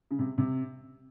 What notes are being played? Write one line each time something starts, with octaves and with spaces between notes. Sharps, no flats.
C#3
C3
C3